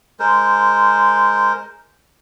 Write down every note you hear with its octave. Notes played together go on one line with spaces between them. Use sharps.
G#3 A#4 C5